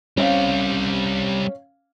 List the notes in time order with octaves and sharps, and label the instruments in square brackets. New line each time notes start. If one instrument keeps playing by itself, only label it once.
[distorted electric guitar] G3 C4 [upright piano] C#4 F5